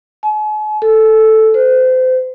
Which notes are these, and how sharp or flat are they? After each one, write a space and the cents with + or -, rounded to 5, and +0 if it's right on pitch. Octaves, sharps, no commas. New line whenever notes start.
G#5 +45
A4 +0
C5 -30